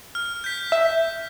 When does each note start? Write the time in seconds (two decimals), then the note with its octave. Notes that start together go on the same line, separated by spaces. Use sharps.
0.15 F6
0.44 G6 B6
0.72 E5